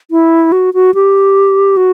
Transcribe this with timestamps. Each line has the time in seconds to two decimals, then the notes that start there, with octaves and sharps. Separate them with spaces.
0.11 E4
0.52 F#4
0.74 F#4
0.94 G4
1.77 F#4